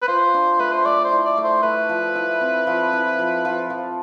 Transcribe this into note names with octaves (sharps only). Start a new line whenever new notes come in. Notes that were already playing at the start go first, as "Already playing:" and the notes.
B4
F4 C5
D4
A3 B4
C5
A3 D5
C5
E4
D5
A3
C5
A3 B4
F3
E4
C4
F3
E4
F3
F3
F3